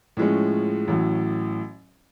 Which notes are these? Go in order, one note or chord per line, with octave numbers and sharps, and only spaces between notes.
A2 F3 G#3 C#4
A1 A2 F#3